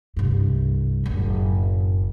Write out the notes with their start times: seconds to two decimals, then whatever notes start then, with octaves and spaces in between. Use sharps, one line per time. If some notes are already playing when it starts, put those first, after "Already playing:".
0.17 C2 G2
1.04 F#1 A2